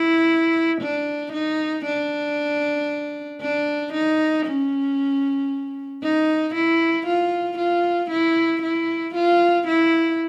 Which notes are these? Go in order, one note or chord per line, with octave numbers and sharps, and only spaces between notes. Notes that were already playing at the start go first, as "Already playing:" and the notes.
Already playing: E4
D4
D#4
D4
D4
D#4
C#4
D#4
E4
F4
F4
E4
E4
F4
E4